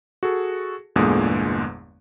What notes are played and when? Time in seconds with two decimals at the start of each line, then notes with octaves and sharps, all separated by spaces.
0.23 F#4 G#4 A4
0.96 G1 E2 A#2 D3 G#3 D#6